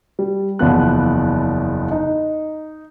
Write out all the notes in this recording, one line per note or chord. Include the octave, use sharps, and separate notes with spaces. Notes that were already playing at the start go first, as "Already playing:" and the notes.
G3
F#1 E2 F3 B3 F#6
D#4